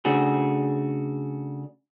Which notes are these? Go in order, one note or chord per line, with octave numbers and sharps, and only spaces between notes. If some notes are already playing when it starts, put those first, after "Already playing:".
C#3 A3 D4 F#4 G#4